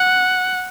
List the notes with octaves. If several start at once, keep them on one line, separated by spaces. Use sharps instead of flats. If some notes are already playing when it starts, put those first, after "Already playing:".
Already playing: F#5